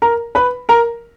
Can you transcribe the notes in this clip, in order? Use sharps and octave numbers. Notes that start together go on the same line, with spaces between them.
A#4 A#5
B4 B5
A#4 A#5